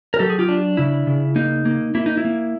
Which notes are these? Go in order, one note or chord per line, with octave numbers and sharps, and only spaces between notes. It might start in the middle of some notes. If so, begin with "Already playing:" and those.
A#4
F#3 G4 A4
G#4
F4 G4
D4
C#3 E4
C#3
A#3 D#4
A#3
A#3 E4
D#4
E4
A#3